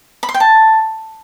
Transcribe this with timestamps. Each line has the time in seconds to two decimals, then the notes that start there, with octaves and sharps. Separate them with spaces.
0.23 B5
0.29 C6
0.34 G5
0.40 A5